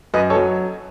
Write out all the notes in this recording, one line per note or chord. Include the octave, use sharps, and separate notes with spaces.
F#2 B4 D#5
A4 C#5
F#3